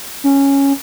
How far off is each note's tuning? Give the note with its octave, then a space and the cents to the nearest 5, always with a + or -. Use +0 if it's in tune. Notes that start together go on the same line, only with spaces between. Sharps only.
C#4 -5